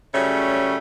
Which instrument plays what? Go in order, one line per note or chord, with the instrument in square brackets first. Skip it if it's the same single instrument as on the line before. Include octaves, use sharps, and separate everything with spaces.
[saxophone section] C#3 F#3 G3 A3 C#4